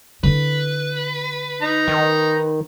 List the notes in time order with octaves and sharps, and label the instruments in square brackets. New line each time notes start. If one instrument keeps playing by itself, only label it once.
[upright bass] D3 E4 [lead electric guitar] B4
[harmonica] D#4 A#5
[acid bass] D#3